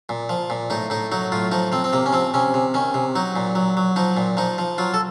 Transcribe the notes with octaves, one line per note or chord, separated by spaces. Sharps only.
A#2
F3
A#2
A2 D#4
A2 D#4
F#3 D#4
A2 F4
F3 D#4
F3 C4
C4
C3 A#3
C#4
F3 C4
C3 C#4
C3
D#3 C#4
C3
F#3 D#4
A#2
F#3
F#3
F3 D#4
A#2
F3 D#4
F3
F#3 F4
A4